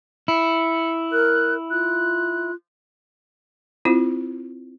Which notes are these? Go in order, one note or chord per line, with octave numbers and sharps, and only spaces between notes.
E4 C#7
A#4 F#6
F4 F#6
C4 E4 F4 C5